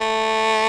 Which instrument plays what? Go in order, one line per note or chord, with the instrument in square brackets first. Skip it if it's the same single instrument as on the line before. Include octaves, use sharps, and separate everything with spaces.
[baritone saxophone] A3